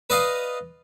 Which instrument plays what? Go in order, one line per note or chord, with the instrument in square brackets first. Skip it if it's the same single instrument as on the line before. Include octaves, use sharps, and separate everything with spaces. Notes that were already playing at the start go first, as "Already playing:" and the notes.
[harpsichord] B4 D5 D#5 F5